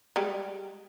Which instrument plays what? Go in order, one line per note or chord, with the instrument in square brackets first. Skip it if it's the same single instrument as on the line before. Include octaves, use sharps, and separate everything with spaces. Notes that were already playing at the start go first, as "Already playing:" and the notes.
[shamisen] G3 G#3 G4